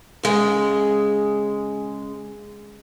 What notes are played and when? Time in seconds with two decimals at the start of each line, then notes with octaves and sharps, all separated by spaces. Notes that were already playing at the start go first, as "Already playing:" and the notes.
0.23 C#3 G#3